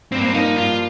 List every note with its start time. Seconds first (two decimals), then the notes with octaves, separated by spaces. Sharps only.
0.12 G2 C4
0.19 A#3
0.26 C4
0.34 F3 A#3 D#4
0.57 G2 F4